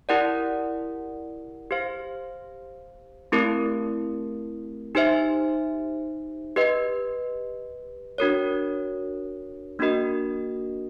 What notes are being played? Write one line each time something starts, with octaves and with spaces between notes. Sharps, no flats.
E4 G4 A#4 D5 F#5
G4 C5 F5
A3 C4 E4 G4 A#4
D#4 G4 C5 E5
G4 B4 D#5
D4 F#4 A#4 C#5
A#3 D4 F#4 A#4 D#5